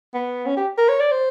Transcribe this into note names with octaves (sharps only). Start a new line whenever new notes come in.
B3
C#4
G4
A#4
C#5
D5
C5